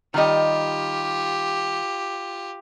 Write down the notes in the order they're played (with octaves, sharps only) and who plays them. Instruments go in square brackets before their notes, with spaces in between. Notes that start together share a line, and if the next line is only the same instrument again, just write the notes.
[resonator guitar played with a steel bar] D#3 G3 D#5 [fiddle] F4 G4